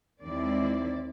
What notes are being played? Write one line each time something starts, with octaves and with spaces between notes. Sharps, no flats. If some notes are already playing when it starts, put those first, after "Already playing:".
D#2 D#3 G#3 C4 E4 D5